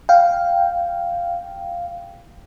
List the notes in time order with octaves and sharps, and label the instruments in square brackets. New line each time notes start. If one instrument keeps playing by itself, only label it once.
[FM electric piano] F5 G5